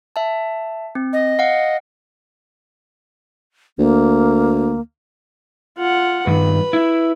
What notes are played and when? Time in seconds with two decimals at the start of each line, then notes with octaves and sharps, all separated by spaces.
0.16 E5 A5
0.95 C4
1.13 D#5
1.39 F5 F#5
3.79 D2 A#3
5.78 F4 F#5
6.27 G2 D#3 B4
6.73 E4